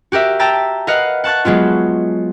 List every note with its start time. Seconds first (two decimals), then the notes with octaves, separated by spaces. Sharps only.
0.12 F#4 G4 A#4 E5
0.39 G5 A5 A#5 E6 A6 B6
0.87 A#4 B4 D#5 F5 F#5
1.24 F#5 A5 C#6 F#6 A6
1.45 F#3 G#3 B3 F4